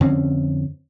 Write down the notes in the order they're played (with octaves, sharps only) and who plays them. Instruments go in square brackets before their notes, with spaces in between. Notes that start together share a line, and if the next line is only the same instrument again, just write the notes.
[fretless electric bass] F2 D3 C4 C#4